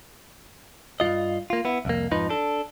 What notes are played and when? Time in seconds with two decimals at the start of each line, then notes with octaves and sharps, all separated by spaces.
1.00 G2 C#3 F4 D#5
1.50 A#3 F4
1.65 B3 E4
1.85 C2 F2 A#3
2.11 F2 G#2 F3 D#4 B4
2.29 D4 A4